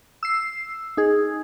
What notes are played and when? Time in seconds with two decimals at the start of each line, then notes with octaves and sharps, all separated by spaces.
0.23 E6 C7
0.97 D#4 G#4